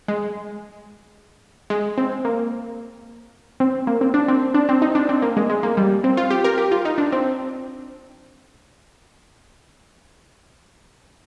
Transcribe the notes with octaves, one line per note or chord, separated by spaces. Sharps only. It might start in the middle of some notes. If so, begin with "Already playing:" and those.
G#3
G#3
C4
A#3
C4
A#3
C4
D4
C4
D4
C4
D#4
D4
C4
A#3
G#3
G#3
A#3
G3
C4
F4
G4
A#4
G4
F4
D#4
D4
C4